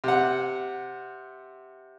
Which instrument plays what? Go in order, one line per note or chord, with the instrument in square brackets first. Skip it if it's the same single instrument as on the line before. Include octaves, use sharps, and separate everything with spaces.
[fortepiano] C3 F#5